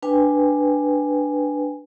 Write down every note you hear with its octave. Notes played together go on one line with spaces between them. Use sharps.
D4 B4 G5 G#5